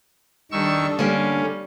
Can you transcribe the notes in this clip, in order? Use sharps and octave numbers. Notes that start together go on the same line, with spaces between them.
D#3 G3 D4 A4 C#6 E6
D3 G3 A#3 C#4